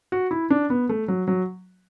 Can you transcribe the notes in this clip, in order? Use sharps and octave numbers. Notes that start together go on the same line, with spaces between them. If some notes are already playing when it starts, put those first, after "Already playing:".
F#4
E4
D4
B3
A3
F#3
F#3